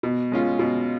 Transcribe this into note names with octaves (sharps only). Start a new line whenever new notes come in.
B2
G#3 C#4 F4
B2